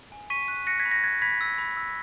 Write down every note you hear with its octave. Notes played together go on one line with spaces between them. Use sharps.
G#5
C#6 B6 D#7
F#6
F#6 A#6 C#7
G#6 B6
B5
A#6
F#6 G#6
B5 G#6 B6
E6
B5
E6